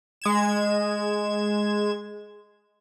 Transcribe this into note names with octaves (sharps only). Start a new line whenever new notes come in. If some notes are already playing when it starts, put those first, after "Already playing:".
G#3 G#6 E7